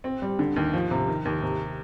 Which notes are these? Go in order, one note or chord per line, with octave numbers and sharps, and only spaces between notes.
C4
G3
D3
D#2
F3
C3
D#3
D#2
C3